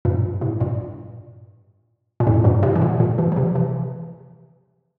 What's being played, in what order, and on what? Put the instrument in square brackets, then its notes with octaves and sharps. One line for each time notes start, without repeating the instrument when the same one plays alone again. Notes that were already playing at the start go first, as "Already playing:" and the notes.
[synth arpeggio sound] G2 A#2
A2 C3
G2 A#2
A#2
F2 A2
G2 A#2
A2 C3
E3
A#2 D3
A#2 D3
C3 E3
F3
C3 E3
C3 E3